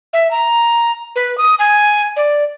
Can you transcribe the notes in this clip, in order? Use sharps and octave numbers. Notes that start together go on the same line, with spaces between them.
E5
A#5
B4
D#6
G#5
D5